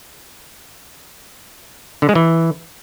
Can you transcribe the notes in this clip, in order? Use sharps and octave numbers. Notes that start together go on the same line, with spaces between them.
D3
G#3
E3